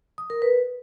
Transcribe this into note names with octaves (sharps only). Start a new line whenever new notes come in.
D#6
A#4
B4